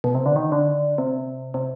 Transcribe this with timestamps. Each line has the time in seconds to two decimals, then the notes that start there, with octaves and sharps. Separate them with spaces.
0.04 B2
0.15 C3
0.26 D3
0.36 D#3
0.52 D3
0.98 C3
1.54 C3